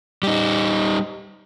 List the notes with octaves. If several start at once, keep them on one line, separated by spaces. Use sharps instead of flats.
G3 D#4